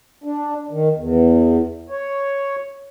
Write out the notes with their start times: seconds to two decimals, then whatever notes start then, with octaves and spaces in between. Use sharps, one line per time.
0.24 D4
0.71 D#3
0.96 E2
1.90 C#5